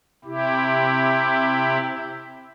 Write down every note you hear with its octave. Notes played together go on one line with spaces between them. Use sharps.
C3 E4 G4